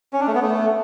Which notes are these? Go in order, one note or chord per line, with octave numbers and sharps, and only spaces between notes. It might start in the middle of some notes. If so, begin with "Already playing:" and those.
C#4
D4
A3
B3
A3